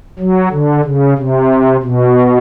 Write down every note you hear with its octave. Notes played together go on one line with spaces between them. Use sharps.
F#3
D3
C#3
C3
B2